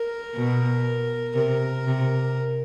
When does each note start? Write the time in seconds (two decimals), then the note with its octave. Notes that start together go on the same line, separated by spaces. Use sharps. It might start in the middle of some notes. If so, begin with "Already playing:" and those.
Already playing: A#4
0.35 B2
1.35 C3 A#4
1.86 C3